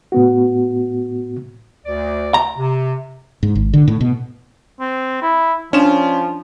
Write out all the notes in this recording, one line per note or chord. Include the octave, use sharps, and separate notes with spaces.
A2 B3 F#4
D2 D5
A#5
C3
G#2
G#1
D3
A2
B2
C4
E4
F3 C#4 D4 E7